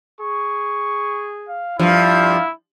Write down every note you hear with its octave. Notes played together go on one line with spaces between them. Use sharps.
G#4 C#6
F5
G2 F3 E4 F5